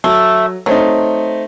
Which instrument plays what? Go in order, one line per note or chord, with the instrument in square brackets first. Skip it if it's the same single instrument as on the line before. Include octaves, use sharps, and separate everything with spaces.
[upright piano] F#3 [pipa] A3
[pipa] F#3 [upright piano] A3 C4 D#4